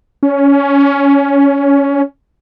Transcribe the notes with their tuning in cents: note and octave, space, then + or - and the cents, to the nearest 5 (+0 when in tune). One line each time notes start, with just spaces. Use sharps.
C#4 +15